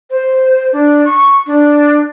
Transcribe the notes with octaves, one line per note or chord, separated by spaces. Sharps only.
C5
D4
C#6
D4